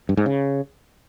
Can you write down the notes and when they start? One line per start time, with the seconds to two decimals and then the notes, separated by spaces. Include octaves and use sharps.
0.09 G2
0.17 G#2
0.26 C#3